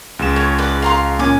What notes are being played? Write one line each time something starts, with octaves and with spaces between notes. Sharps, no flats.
C#2 G#3 E7
C#5
B4 D5
F5 A#5 C6
A#2 C#4 G#5 D6